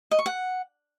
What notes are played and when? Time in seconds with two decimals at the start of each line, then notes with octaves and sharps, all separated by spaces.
0.11 D#5
0.19 C#6
0.26 F#5